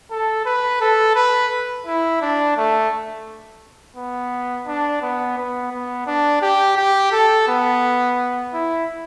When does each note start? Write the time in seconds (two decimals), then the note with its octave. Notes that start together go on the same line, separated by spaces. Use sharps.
0.11 A4
0.45 B4
0.81 A4
1.15 B4
1.87 E4
2.21 D4
2.57 A3
3.97 B3
4.67 D4
5.02 B3
5.38 B3
5.73 B3
6.07 D4
6.42 G4
6.77 G4
7.12 A4
7.48 B3
8.53 E4